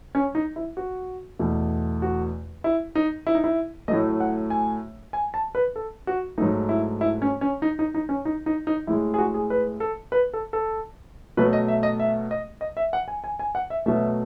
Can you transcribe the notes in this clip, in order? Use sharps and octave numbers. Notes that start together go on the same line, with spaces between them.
C#4
D#4
E4
F#4
E2 B2 A3
F#4
E4
D#4
E4
D#4
E4
A2 F#3 A3 D#5
F#5
G#5
G#5
A5
B4
A4
F#4
G#2 F#3 A3 D#4
E4
E4
C#4
C#4
D#4
D#4
D#4
C#4
D#4
D#4
D#4
A2 G#3 E4
G#4
F#4
G#4
B4
A4
B4
A4
A4
B2 F#3 A3 B4
D#5
E5
D#5
E5
D#5
D#5
E5
F#5
G#5
G#5
G#5
F#5
E5
B2 F#3 A3 E5